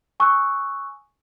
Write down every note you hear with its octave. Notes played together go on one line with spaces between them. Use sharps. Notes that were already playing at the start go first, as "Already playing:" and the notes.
G#5 C#6 D#6 E6 F#6